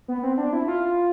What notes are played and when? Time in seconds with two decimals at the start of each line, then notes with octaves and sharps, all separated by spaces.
0.08 B3
0.23 C4
0.38 D4
0.53 E4
0.68 F4